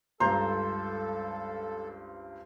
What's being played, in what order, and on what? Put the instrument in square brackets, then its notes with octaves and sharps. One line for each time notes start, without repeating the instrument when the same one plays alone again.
[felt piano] C#2 G2 [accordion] A4 [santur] C5 [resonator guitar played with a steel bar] A#5